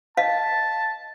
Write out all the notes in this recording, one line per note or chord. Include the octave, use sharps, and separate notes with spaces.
D#5 F5 A5